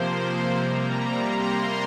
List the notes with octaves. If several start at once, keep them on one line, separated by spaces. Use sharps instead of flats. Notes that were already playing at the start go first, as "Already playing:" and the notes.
Already playing: C3 F3 A#3 C5
C3 G3 A#3 A#5
C6